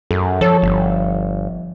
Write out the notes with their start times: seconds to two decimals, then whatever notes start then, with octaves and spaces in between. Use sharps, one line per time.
0.11 F#2 A4
0.41 F3 A4 C#5
0.62 G1